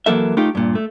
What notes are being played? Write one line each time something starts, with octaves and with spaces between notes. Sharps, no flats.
E3 F#3 A#3 A4 E5
A3 D#4 F4 G4
G2 A#2
A3